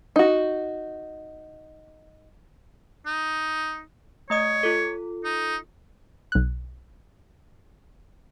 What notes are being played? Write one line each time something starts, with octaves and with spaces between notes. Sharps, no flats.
D#4 F#4
D#4
A3 C#5 D#5 D#6
F4 A4
D#4
B1 F#6